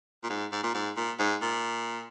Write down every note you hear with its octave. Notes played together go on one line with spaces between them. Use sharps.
A#2
G#2
G#2
A#2
G#2
A#2
G#2
A#2